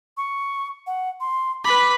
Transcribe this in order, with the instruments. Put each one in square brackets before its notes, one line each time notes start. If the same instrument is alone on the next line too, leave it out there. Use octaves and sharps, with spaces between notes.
[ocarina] C#6
F#5
C6
[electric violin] B4 B5 [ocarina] D6